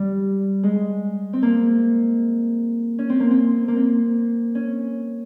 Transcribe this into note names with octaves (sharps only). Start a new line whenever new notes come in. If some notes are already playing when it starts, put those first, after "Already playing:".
Already playing: G3
G#3
C4
A#3
C#4
C4
A#3
C4
A#3
C4
C#4